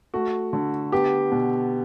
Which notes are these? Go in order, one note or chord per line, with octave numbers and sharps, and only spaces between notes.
A3 F#4
D3
B3 G4
B2